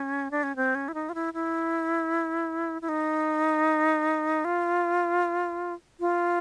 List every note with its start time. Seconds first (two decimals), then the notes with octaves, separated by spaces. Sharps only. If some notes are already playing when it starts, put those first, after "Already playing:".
Already playing: C#4
0.31 D4
0.43 C#4
0.56 C4
0.75 C#4
0.88 E4
0.94 D#4
1.09 F4
1.15 E4
1.34 E4
2.82 E4
2.89 D#4
4.45 F4
6.00 F4